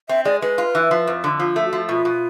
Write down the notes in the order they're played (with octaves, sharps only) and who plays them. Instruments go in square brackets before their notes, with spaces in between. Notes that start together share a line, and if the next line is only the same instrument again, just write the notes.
[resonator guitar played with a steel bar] C4 [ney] E5
[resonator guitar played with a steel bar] G#3 [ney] D5
[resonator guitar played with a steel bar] G#3 [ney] B4
[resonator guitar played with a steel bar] F4
E3
F3
F2
D3
[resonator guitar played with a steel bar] F3 [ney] F4
[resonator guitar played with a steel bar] A3
[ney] F#4
[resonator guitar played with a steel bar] F3
[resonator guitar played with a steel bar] B2 [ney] F4
[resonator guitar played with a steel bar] B2